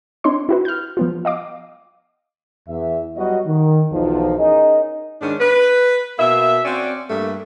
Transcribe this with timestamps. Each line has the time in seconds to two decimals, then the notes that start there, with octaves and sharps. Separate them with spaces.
0.24 C4 D4 D#4 C#5 C6
0.49 E4 F#4 B4
0.65 F6 G6
0.97 F3 B3 F4
1.25 D#5 F5 D6
2.68 E2 E5
3.17 F#3 G3 B3 F#4 D#5
3.47 D#3
3.92 B1 E2 F3 D#4
4.39 C#4 D#4 G#4 A#4 D#5
5.21 G#2 D#3 C#4 D4
5.40 B4
6.19 B2 A#3 E5
6.65 C4 C#4 F#4 D5
7.10 G2 A3 A#3